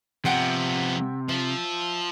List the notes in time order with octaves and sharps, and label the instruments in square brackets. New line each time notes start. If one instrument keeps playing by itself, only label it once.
[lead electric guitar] C3 [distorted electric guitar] F3 B3 [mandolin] E5 F#5 G5
[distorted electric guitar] F3 [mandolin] E5